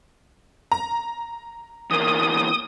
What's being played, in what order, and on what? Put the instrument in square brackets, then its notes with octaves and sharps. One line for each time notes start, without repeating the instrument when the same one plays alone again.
[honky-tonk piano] A#5
[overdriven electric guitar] E2 A#3 [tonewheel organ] D#6